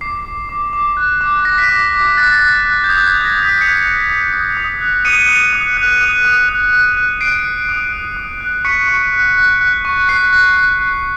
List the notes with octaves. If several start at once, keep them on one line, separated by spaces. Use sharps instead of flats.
D6 C7
D6
D6
D6
F#6
D6
D6 A#6
B6
D6 A#6
D6
F#6 A6
F#6
F#6
G6
D#6 G#6
G#6
F#6
A#6
D#6
B6
F#6 B6 C#7
F#6
D#6
D#6
D#6
F#6
D#6 C#7 D#7
F#6
D#6
F#6
D#6
D#6
F#6
F#6
F#6
F#6 C7 D7
F#6
D#6
F#6
D#6
F#6
C#6 B6 C#7
C#6
F#6
F#6
F#6
C#6
F#6 C7
F#6
F#6
F#6